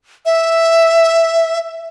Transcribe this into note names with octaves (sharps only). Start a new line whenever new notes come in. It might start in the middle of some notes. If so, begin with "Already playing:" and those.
E5